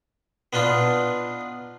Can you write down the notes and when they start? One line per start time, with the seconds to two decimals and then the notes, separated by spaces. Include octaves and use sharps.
0.53 B3 D4 D#4 F4